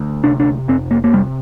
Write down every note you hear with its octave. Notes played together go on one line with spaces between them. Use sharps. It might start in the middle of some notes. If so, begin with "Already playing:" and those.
Already playing: D2
C3 D4
D4
F2 C4
A#3
A#3
C3 G3